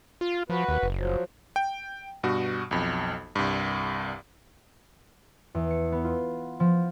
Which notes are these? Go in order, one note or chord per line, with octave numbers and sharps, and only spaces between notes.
F4
F3 F#4 B4
D#2
F#1
F3 F#3
G5
G2 B2 F#4
B1 F2
C2 G2
E2
C#7
B3
F4
F3